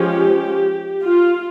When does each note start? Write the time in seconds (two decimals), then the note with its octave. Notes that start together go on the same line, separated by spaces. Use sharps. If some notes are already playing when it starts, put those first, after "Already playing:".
Already playing: F3 G#3 C#4 G4
1.03 F4